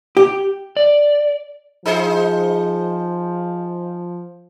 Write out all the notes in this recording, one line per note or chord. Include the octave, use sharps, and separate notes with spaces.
G4
D5
F3 D#4 G#4 C5